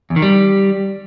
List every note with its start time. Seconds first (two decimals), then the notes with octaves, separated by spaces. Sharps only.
0.10 E2
0.16 D#3
0.22 G3